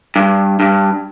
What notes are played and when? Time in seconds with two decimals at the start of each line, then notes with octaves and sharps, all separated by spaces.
0.16 G2
0.60 G2